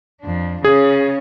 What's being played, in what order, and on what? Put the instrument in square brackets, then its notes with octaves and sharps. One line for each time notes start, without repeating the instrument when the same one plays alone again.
[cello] F2 D4
[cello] C#3 C#4 [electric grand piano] G#4